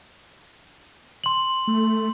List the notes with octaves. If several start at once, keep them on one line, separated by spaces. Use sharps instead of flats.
C6 F#7
A3